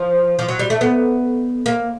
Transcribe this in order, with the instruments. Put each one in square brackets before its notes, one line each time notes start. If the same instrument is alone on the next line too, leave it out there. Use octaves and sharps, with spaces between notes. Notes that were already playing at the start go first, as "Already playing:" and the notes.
Already playing: [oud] F3
F3
F#3
G3
A3
B3
A#3